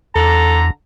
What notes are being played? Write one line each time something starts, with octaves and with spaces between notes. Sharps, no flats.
E2 D3 A4 A#5